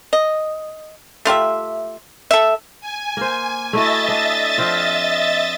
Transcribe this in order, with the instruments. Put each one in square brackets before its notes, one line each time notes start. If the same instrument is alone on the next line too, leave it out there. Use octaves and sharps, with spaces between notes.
[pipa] D#5
A3 F4 G4 E5
A4 E5
[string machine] G#5
[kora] A#3 C5
[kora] A3 E4 F#4 [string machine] D#5 E5 A6
[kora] D4
F3 C4 F4